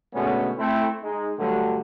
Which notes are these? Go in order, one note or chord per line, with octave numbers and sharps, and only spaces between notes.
B2 D3 G#3 A3 B3 C#4
A3 C4 E4
G#3 D#4
D2 G2 D3 F#3 G3 A3